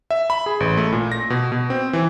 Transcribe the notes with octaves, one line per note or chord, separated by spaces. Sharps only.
E5
B5
G#4
A1
A3
A#2
A#6
B2
B2
C4
E3